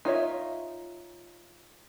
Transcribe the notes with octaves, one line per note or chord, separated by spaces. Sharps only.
D#4 F4 C#5 E5